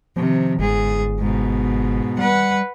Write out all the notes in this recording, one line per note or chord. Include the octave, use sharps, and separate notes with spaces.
C3 D#3 F3
G1 G#2 G#4
G#2 B2
G3 B4 F#5